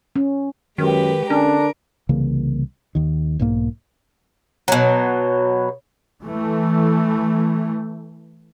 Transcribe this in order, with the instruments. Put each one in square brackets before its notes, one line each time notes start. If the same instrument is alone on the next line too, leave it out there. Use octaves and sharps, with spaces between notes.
[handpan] C#4
[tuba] F#2 [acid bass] D#3 [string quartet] G#3 G4 B4
[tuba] D3 [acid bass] C#4 [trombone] D4 [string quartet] A#4
[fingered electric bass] C2 C#3 E3 A#3
D#2 D#3
B1 G#2 A#3
[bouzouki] B2 F#3
[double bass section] E3 A3